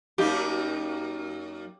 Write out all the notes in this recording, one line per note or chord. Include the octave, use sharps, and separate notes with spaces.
F#2 A#3 D#4 G4